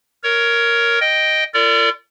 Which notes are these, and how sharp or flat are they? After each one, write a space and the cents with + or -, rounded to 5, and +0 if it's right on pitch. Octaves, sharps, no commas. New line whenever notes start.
A#4 +0 C#5 +15
D#5 +0 G5 +0
F4 -40 A#4 -45 D5 -20